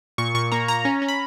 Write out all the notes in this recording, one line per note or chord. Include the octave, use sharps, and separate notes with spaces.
A#2 C#6
A#2 C#6
A#3 A#5
A#3 A#5
C#4
C#4
B5